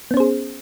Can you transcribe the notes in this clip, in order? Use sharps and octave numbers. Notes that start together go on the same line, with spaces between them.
B3 C#4 G#4 C5